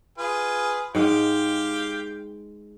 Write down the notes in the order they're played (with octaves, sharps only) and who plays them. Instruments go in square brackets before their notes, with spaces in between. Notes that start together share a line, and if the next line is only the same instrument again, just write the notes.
[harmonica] F4 G#4 B4
[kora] G#2 G#3 [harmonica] G4 F5 G5